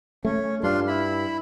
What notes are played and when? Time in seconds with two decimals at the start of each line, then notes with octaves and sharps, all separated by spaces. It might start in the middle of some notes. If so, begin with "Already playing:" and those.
0.25 A3 C#4
0.63 G2 D4 F4 C6
0.88 E4 B5